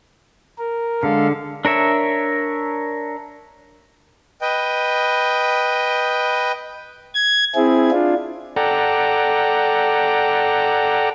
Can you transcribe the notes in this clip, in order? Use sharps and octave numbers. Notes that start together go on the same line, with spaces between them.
A#4
D3 G#3 A4 F5
D4 A#4 C#5 E5
B4 D#5 G5
G#6
C4 E4 G#4
D4 F4
A4 D5 F#5 G5 A#5